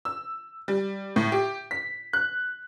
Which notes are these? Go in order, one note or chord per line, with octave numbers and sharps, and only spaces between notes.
E6
G3
A2
G4
B6
F#6